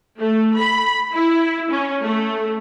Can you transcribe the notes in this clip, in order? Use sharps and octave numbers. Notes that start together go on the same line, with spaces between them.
A3
B5
E4
C#4
A3